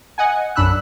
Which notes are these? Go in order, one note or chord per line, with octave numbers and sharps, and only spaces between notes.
D#5 F#5 G#5
B1 F#2 D4 B5 E6 F#6